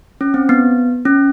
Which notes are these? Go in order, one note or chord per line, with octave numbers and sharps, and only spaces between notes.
C#4
C4
B3
C#4